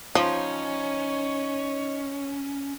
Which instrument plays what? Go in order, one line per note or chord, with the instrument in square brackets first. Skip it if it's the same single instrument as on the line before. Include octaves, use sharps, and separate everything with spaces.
[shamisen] F3 [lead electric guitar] C#4 [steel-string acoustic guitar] D#4 [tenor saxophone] C#5